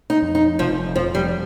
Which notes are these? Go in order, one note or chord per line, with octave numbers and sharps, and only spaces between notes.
D#4
F2
D#4
F1 F3
F2 F3
G3